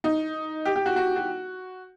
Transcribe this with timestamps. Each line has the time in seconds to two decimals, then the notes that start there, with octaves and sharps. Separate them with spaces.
0.04 D#4
0.65 G4
0.76 G4
0.86 F#4
0.96 F#4
1.16 F#4